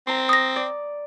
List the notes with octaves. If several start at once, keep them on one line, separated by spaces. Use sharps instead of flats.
C4 A#5 C6
D#6 A#6
D5